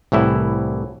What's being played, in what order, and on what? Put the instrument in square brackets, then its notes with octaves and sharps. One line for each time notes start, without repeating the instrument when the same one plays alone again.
[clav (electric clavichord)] C2 A2 E3 E4